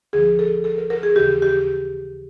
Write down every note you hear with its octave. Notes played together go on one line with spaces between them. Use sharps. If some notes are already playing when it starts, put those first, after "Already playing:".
D2 D3 F3 G#4
A4
A4
A#4
A#4
G#4
D#2 C#3 E3 G4
G4